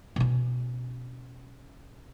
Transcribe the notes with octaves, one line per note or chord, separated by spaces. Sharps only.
B2 C#4